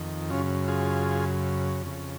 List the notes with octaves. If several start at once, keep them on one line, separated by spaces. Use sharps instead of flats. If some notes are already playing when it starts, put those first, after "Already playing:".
Already playing: F2 D#3
F#2 C#3 C#4 F4
F4 G#4
F2 C#3